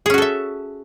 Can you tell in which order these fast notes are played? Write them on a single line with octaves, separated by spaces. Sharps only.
G#4 C#4 F#4 A4 E5